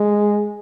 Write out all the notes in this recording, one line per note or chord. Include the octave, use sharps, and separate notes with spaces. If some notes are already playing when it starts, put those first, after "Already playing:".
Already playing: G#3